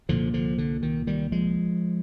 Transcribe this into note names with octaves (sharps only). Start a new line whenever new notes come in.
C2 A#2 D3 F3
D3 F3
D3
D#3
D#3 G3
F3 G#3